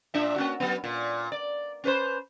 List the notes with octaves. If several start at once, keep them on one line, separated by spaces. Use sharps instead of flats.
A#2 D4 E5
A#3 C#4 F#4
F#3 B3
A#2
D5
C#4 B4 C5